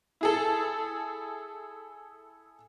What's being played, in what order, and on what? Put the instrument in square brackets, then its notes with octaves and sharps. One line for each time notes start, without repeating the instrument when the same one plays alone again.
[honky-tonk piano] E4 G#4 A4